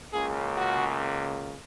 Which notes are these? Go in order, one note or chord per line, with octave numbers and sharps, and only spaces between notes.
C#2 C#3 A#3 G#4
F#4